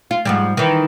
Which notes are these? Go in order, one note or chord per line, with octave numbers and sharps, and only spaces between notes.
F4
G#2 F3 G3
D#3 E3